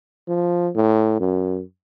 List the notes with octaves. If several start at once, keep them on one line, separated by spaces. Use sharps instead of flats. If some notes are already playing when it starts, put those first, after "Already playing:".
F3
A2
F#2